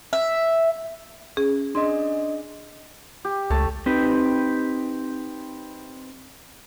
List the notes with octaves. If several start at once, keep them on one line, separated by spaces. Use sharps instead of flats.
E5
C#4 G#4
D4 G#4 D#5 C6
G4
C#2 A3 C#5 A5
C4 D#4 G4 B4